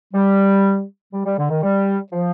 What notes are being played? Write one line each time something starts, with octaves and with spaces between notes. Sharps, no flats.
G3
G3
G3
D3
D#3
G3
F3